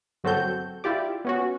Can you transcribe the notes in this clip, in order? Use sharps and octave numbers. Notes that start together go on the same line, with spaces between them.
G1 F#3 C4 F#4 A4 G6
E4 F4 G4 D5
B3 C#4 F#4